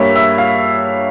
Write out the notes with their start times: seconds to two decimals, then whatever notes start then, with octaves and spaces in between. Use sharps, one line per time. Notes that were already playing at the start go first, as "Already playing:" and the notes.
Already playing: G2 G3 A#3 C#5 E5
0.16 E5
0.38 F5